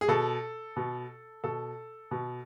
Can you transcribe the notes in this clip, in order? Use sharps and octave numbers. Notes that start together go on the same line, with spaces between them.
G#4
B2 A4
B2
B2 A4
B2